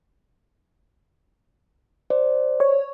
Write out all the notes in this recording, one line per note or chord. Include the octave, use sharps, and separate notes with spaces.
C5 D5
C#5